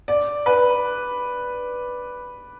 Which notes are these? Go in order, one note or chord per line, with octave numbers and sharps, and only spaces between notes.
D5
B4